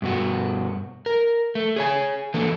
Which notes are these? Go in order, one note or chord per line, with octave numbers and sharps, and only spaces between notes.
G2 B2 F#4
A#4
A3
G#4 C#5 G#5
D3 E3 A#3 G#4 A4